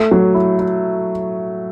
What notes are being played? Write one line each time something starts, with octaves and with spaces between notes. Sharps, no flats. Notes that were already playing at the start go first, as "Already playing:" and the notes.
Already playing: A3
F#3
E4
E4